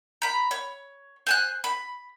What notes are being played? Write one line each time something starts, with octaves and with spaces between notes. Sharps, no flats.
A#5 B5
C#5
C5 G#5 F#6
B5